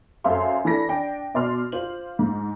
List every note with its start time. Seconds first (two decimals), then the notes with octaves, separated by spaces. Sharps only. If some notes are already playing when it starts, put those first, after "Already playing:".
0.24 F#2 A4 C5 E5 F5 C6
0.65 E3 D4 A4 B5 A#6
0.89 D4 G5 D7
1.34 B2 D5 C6 F6
1.72 F4 C5 F#7
2.19 G#2